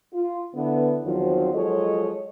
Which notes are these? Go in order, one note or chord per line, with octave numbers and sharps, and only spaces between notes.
F4
D3 B3 E4
E2 D#3 F3 F#3 C4 F#4
F3 F#3 G#3 A4 C#5 D#5